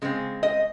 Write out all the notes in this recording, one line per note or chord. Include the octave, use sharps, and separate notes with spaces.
C#3 G#3 C4
D#5